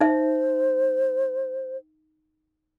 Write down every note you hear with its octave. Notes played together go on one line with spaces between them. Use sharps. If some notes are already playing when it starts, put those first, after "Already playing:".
D#4 C5 E5